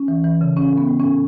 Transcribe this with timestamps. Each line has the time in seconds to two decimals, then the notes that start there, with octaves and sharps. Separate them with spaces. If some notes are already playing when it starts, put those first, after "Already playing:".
Already playing: C#4
0.08 E3
0.24 E3
0.41 C#3
0.56 A2 C#4
0.72 A2
0.78 B3
0.88 A2
0.99 C#4
1.05 A2